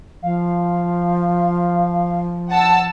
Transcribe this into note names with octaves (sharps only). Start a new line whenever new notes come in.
F3 F5
F#5 A5 E6